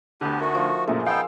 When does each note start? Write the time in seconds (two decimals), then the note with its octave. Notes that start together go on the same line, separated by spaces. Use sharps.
0.21 D2 D3 B3 G4
0.40 A3 D#4 F#4 A#4
0.55 F3
0.87 F#2 A#2 G#3 A3
1.07 B3 D#4 F5 G5 E6